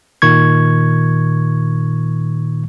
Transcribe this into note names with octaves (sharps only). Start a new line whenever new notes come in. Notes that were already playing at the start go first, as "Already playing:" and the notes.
A#2 D#3 C#6 G#6